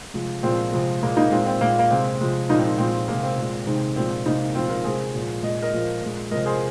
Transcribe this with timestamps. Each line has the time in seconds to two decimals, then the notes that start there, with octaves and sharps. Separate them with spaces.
0.14 C3 F3 G#3
0.43 A#2 F3 G#3 C4
0.72 C3 F3 G#3
1.02 A#2 G#3 A#3
1.17 A#3 D#4
1.31 A#2 G#3 C4 F4
1.46 C4
1.61 A#2 G#3 A#3
1.79 A#3
1.91 C3 G#3 C4
2.20 C3 F3 G#3
2.49 A#2 F3 G#3 A#3 D#4
2.59 C4
2.78 A#2 F3 G#3 C4
3.08 C3 G#3 A#3
3.23 C4
3.37 A#2 G#3
3.67 C3 D#3 G#3
3.96 A#2 F3 G#3 C4
4.26 C3 G#3 A#3 D#4
4.55 A#2 F3 G#3 C4 F4
4.70 F4 A#4
4.84 C3 G#3 G#4 C5
5.14 A#2 F3 G#3
5.43 A#2 G#3 D#5
5.62 A#4 D#5
5.72 A#2 F3 G#3
6.02 A#2 G#3
6.31 C3 F3 G#3 A#4 D#5
6.46 G#4 C5